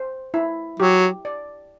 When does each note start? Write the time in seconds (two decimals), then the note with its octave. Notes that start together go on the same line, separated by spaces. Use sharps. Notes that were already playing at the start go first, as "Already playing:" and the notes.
Already playing: C5
0.34 E4
0.80 F#3 G4
1.25 D5